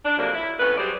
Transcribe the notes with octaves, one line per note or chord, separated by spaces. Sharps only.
D4
F2 C3 F#3 A#3
E4
F2 A2 B3 C#4 B4
F#3 G3 C4 G#4 C5 D5